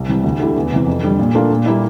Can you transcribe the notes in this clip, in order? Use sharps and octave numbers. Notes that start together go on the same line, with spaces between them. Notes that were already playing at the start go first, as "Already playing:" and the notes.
Already playing: C2
C3 E3 G3
D2
D3 A3 E4 G4
E2
C3 E3
F2
D3 G3
A#2
A3 D4 F4 A#4
A#2
G3 A#3 E4